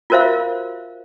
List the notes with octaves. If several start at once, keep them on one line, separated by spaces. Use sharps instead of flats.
F4 F#4 A#4 C5 E5 F5